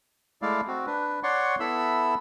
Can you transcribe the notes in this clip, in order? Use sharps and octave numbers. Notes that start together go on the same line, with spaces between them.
G#3 A3 E4 D5 F5
C4 F#4
D4 B4
C#5 D5 F#5 C6 C#6
B3 E4 A4 E5 B5 E6